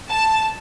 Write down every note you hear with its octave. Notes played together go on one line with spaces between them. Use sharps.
A5